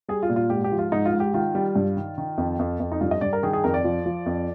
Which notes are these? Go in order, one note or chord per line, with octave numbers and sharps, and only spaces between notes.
G3 G#4
F4
A#2
F4
G#2 G4
G4
F3
F4
G#2 D#4
F4
G#2
G4
D#3 F4
G3
G2
D#3
D#3
F2
F2
F2
D#4
G2 F4
D#5
G2 D5
A#4
D#3 G#4
G#4
F2 A#4
D5
F3
F3
F2